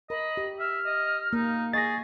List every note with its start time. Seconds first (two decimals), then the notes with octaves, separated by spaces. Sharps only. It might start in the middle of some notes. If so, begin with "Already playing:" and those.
0.10 A#4 D#5 B5
0.37 G4
0.59 E5 F6
0.86 D#5
1.33 A#3 D#4
1.73 G#4 D#5 C#6 A6 A#6